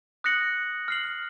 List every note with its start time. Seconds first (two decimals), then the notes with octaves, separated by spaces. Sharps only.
0.24 D#6 F#6 A#6 C#7 F#7
0.88 F6 C7 F#7